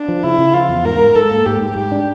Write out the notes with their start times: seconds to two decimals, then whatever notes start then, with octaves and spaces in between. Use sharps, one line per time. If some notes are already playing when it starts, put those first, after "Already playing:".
Already playing: D4
0.08 F3
0.23 C#3 E4
0.38 C#3
0.54 F3 F4
0.69 E2
0.85 G#2 A#4
1.00 G#2
1.15 G#2 A4
1.31 A#3
1.46 G#2 G4
1.61 G#2
1.76 G#2 G4
1.92 D4